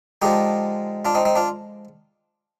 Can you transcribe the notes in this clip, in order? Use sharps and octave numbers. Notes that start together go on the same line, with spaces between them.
D3 F3 G#3 D#4 G4
D4 F4
C4 D#4
C4 D#4
D4 F4